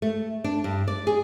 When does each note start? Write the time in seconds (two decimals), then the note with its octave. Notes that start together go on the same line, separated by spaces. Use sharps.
0.02 A3
0.44 D4
0.64 G2
0.88 D5
1.07 G#4